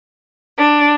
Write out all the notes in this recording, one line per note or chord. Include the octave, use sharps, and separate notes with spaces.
D4